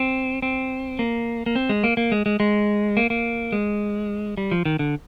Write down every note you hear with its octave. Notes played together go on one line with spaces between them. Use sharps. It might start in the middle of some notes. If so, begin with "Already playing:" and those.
Already playing: C4
C4
A#3
A#3
C4
G#3
A#3
A#3
G#3
G#3
G#3
A#3
A#3
G#3
G3
F3
D#3
D3